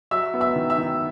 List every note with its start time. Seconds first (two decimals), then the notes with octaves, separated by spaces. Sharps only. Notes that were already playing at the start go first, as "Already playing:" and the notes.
0.11 F#3 E5 E6
0.34 B3
0.41 E5 E6
0.56 D#3
0.70 E5 E6
0.78 D#3